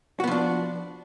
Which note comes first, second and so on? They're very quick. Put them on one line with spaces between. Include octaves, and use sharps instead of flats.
F#4 B3 F3 D4